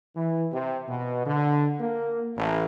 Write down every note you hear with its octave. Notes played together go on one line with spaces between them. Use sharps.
E3
C3
B2
D3
A#3
A1